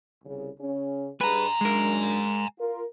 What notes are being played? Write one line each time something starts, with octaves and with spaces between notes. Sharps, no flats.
C2 C#3
C#3 C#4
G3 D4 G#4 B4 G#5 A#5
F#2 G#3 D4 A#4
F4 A#4